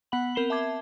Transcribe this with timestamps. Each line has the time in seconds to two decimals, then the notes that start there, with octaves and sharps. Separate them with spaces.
0.12 B3 F#5 B5 F#7
0.35 C4 A#4 B5 C7 E7 G7
0.50 E5 A5 D6 G#6